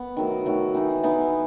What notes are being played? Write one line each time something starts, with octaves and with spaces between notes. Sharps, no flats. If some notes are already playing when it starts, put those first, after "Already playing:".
Already playing: B3
D#3 F#3 A3
D#3 F#3 A3
E3 B3 D#4
E3 B3 D#4